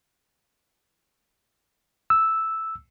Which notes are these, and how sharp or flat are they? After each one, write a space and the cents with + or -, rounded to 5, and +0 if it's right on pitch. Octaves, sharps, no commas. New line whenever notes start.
E6 -5